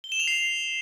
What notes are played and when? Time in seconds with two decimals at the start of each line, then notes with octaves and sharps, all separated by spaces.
0.04 G7
0.12 E7
0.20 F7
0.28 C7